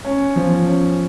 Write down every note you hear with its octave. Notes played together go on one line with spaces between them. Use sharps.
C#4
F3
C#4